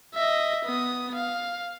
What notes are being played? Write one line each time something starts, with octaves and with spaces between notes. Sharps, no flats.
D#5 E5
B3 D#6
F5